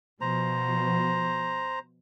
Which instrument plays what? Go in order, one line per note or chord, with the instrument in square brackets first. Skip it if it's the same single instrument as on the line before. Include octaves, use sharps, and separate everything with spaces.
[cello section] B2 F3 [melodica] C5 A#5